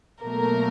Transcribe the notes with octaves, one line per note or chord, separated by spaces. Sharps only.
B2 F#3 A3 A#3 A#4